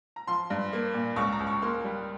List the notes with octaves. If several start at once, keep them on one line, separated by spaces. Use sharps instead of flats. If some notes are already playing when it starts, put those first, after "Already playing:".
A#5
F3 C6
G2
A#3
A#2
C#2 C#6
A#5
C#2
C#6
A#3 C6
G3